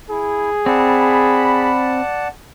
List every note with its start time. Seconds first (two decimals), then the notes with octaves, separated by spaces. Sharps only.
0.10 E4 G#4
0.66 C4 D5 F#5 A5 B5